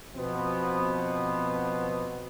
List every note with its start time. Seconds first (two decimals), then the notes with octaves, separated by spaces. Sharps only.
0.16 B2 F3 B3 C4